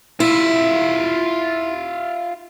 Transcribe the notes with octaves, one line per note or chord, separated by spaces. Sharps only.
E4 F4 E5